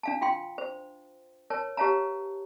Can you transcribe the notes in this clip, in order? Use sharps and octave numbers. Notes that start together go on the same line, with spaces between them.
D4 F5 A5
F4 F5 G5 C6
C5
A#4 C#5 A5
G4 B4 C#5 F5 A5 A#5